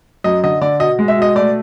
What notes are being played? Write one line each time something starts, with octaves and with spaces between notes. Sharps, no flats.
F#2 D#5
D3 D#5
D3 D5
B2 D#5
G#3
E5
B2 D#5
A3 D5